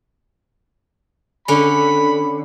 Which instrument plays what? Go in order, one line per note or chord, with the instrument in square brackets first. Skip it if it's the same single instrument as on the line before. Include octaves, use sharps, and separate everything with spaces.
[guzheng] D3 C#4 [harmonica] B5